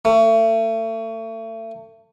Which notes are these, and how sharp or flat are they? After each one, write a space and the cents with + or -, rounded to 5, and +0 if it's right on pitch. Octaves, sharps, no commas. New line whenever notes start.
A3 +35